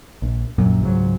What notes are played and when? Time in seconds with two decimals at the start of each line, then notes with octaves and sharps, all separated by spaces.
0.22 A#1
0.58 A#1 F#2 A#2 F#3
0.81 C#2 G#2 F#3